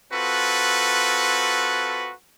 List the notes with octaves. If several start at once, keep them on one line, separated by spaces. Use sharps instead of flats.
C4 F4 F#4 A4 B4